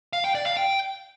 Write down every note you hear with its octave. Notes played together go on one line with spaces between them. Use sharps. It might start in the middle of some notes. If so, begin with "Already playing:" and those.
F5
G5
D5
F5
G5